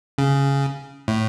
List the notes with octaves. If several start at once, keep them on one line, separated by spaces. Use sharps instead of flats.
C#3
A2